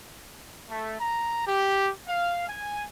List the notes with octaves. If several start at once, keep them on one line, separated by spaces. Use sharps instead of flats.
A3
A#5
G4
F5
G#5